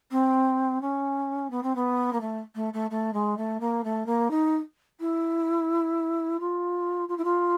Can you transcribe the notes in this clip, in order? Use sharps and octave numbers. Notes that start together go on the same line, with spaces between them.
C4
C#4
B3
C4
B3
A#3
A3
A3
A3
A3
G#3
A3
A#3
A3
A#3
D#4
E4
F4
F4
E4
F4